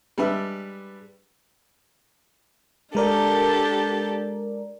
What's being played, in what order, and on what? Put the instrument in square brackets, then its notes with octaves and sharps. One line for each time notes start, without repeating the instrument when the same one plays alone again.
[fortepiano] G3 G#3 D4 B4 E5
[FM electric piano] G#3 A#4 D5 [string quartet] D4 G4 A4